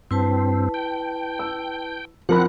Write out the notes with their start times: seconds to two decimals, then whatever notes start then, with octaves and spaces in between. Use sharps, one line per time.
0.11 G2 C4 E4 B4 A5
0.74 G5
1.39 E6
2.29 F3 C4 A#4 F#5 B5 F#6